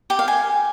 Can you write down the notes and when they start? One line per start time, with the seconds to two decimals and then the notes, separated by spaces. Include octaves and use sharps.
0.10 G4
0.19 F5
0.28 G#5